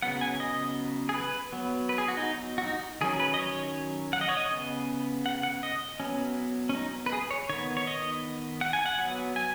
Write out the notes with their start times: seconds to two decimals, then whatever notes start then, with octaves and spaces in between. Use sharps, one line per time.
0.02 C#3 F#3 B3 F#5
0.21 G#5
0.40 D#5
1.09 G#4
1.14 B4
1.52 F#3 B3
1.89 B4
1.98 G#4
2.08 F#4
2.17 D#4
2.58 F#4
2.64 D#4
3.01 D#3 F#3 C#4 G#4
3.20 B4
3.34 D#5
3.39 C#5
4.13 F#5
4.21 D#5
4.29 C#5
4.37 D#5
4.51 C#3 B3
5.26 F#5
5.43 F#5
5.63 D#5
6.00 F#3 B3 C#4
6.69 C#4
6.75 D#4
7.06 B4
7.13 G#4
7.31 C#5
7.49 D#3 B3 C#5
7.77 C#5
7.87 D#5
8.61 F#5
8.73 G#5
8.86 F#5
8.99 F#3 B3
9.36 G#5